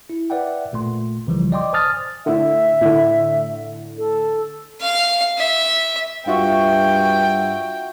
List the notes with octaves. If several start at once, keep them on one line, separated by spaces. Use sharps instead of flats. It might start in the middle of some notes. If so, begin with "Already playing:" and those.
E4
B4 D5 E5 F#5 G5
A1 A#2 A3 C6
C2 C#3 E3 F3 G3
D5 D#5 G5 C6 D6
C5 G#5 A5 D#6 F6 A6
A2 D3 E5
A2 D3
A4
F5
E5
G2 F4 F#4 E5 G5